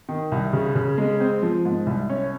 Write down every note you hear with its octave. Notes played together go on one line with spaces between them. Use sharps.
D#3
C2
C#3
C#3
G#3
C4
F3
G#2
C2
C#4